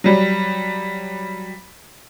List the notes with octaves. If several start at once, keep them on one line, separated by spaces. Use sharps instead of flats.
F#3 G3